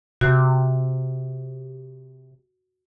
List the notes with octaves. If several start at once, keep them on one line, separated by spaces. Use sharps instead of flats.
C3 F#4